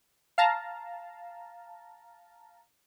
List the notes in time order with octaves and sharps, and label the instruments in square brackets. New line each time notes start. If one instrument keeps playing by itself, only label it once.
[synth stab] F5 A5 A#5